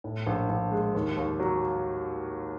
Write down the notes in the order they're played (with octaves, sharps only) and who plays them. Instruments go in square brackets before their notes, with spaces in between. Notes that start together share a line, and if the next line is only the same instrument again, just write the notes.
[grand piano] A2
A#1
A#1
G#3
D#2
D#2
F#3